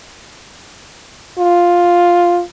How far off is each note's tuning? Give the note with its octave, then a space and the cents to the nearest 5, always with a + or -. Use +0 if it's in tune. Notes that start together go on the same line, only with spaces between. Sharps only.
F4 +5